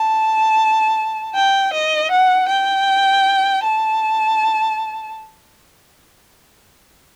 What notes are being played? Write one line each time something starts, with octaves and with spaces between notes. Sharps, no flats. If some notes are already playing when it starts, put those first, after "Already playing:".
Already playing: A5
G5
D#5
F#5
G5
A5